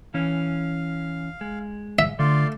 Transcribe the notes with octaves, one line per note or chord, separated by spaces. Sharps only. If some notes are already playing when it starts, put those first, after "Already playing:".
E3 C#4 F5
G#3
E5
D3 A3 F4 D5 C6